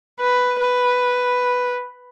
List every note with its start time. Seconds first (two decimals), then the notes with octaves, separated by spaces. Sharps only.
0.20 B4
0.60 B4